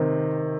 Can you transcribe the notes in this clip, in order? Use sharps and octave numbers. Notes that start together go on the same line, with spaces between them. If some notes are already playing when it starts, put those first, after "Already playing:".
Already playing: C3 D#3 C4